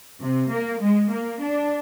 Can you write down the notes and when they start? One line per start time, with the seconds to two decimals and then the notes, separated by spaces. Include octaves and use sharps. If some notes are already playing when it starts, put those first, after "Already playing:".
0.22 C3
0.51 A#3
0.81 G#3
1.12 A#3
1.42 D4